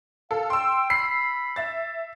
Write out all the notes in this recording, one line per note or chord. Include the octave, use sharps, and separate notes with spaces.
A4 F5
G5 C6 E6
B5 C7
E5 A6